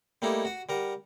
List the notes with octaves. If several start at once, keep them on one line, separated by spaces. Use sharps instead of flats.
G3 A3 A#3 D#4 E4 A4
F#4 F#5
G3 A#4 F#5